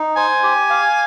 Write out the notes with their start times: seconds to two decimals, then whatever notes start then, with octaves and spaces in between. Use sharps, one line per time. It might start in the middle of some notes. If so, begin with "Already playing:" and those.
Already playing: D#4
0.16 C5 G#5
0.43 G4
0.70 F5